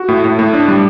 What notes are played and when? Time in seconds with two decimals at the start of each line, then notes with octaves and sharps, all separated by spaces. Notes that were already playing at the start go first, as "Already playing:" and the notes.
Already playing: F#4
0.08 A2
0.24 A2
0.39 A2
0.54 D4
0.68 G3